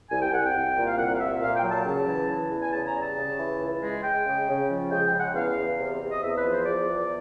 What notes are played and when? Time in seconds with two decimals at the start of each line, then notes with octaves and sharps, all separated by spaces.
0.10 C2 G#5
0.22 G5
0.32 C2 F#5
0.46 G5
0.54 C2
0.76 A#2
0.87 F5
0.97 C2 F#5
1.15 F5
1.20 A#2 E5
1.42 A#2 F5
1.56 G5
1.63 F#3
1.71 A5
1.85 C#3
2.06 E3
2.29 E3
2.51 E2
2.62 G#5
2.73 C#3 A5
2.87 A#5
2.95 G3
3.02 A5
3.16 C#3
3.38 E3
3.60 C#2
3.82 G#3
4.03 G#3 G5
4.26 C#3
4.48 C#3
4.69 F3
4.91 G#3 G5
5.06 G5
5.13 C#3
5.20 F#5
5.35 E2 F5
5.57 E2
5.79 C3
6.00 C3
6.11 D#5
6.23 E2 E5
6.38 B4
6.44 F3
6.51 C5
6.66 E2 D5
6.88 E2